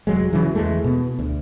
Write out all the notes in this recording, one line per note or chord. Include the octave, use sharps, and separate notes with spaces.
F1 F#3 G#3
C#3 E3 F#3
E2 E3 G#3 A3
B2
D2